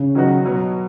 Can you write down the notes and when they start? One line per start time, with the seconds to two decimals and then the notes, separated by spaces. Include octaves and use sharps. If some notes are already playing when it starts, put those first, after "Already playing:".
Already playing: C#3
0.15 D#3 F#3 B3 D#4 F#4
0.44 B2 F#3 B3